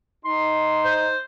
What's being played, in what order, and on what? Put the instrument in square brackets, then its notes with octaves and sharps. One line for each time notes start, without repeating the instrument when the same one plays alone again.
[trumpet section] D#4 [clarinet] C6
[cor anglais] C5